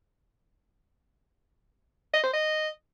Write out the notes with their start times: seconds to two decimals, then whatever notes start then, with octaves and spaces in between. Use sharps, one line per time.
2.14 D#5
2.24 C5
2.34 D#5